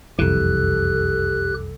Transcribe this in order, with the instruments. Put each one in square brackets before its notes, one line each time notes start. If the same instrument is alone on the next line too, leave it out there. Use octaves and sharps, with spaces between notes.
[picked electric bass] F#1 F2 [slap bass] C2 E3 [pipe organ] G4 F#6 [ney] A4